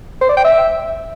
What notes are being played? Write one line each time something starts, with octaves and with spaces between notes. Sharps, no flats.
C5
D5
G5
E5